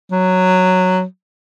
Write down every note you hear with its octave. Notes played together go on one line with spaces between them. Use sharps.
F#3